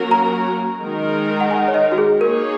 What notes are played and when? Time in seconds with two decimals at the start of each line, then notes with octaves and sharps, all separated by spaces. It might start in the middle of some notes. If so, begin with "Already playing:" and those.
Already playing: F#3 A#3 C#4 F#4 A#4
0.11 A#5
0.81 D#3 G#3 D#4 A#4
1.40 F#5
1.51 G#5
1.68 C#5
1.74 D#5
1.92 F#4
1.98 G#4
2.21 A#3 D#4 G#4 A#4 C#5